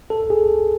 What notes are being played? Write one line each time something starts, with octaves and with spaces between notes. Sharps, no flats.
A4
G#4